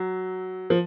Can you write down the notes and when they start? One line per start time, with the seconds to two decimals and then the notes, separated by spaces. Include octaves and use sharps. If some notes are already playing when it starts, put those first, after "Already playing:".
Already playing: F#3
0.70 F3